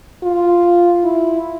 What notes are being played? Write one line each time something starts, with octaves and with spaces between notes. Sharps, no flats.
F4
E4